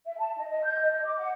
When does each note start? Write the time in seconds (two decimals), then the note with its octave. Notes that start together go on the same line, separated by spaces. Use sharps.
0.06 E5
0.18 A5
0.37 D#5
0.49 D#5
0.64 G6
0.79 D#5
0.92 D#5
1.04 D6
1.19 F#5